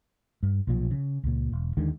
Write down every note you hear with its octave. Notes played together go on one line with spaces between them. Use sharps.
G2
B1 A#2 F3
C#3
C#2 A#2
E1
D#2 D3 D#3 G#3